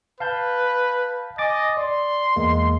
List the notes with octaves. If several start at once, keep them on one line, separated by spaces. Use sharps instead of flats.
B4 F5 A5 G6
D#5 G#5 D6 A6
D5 C6
E2 G#3 A#3